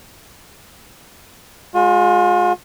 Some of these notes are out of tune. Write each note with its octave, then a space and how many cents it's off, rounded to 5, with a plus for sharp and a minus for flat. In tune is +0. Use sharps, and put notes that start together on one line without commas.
G#3 +0 F4 +45